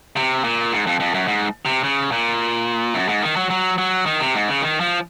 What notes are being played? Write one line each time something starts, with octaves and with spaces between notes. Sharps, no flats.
C3
A#2
G#2
F2
F2
F#2
G#2
C3
C#3
A#2
F#2
G#2
D#3
F#3
F#3
F#3
D#3
C3
G#2
C#3
D#3
F3